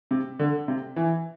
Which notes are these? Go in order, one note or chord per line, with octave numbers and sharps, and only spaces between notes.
C3
D3
C3
E3